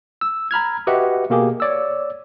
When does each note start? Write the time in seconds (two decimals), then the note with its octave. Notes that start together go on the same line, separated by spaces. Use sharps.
0.21 E6
0.51 A#5 B5 F6 G#6
0.87 F#4 G4 B4 D#5 E5 F#5
1.30 B2 A#3 G4 G#4
1.60 C#5 D5 E6